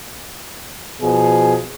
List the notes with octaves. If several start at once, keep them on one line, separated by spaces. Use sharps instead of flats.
B2 F3 G#4